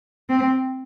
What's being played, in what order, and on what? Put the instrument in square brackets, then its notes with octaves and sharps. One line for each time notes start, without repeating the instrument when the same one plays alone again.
[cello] C4